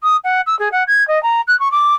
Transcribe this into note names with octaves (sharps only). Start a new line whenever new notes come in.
D#6
F#5
E6
G#4
F#5
G#6
D#5
A#5
F#6
C#6
D6